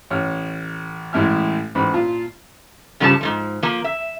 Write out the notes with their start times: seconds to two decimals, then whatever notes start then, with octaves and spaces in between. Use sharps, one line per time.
0.11 A1 C#5 F6
1.13 A1 A2 G#3 E5 G#5 F6
1.75 A1 G#2 B5
1.94 A#2 F4 A5
3.00 G2 C#3 F3 G3 G4 A5
3.21 G#2 B2 F3
3.63 F3 A#3
3.84 E5